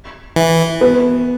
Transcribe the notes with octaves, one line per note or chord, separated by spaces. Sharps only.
E3
B3 B4